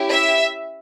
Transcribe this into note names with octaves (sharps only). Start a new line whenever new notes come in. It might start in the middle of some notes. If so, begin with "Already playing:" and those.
Already playing: C#4 E4 G4
E5